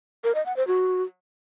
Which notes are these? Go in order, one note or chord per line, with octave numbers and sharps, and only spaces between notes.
A#4
D#5
F#5
C5
F#4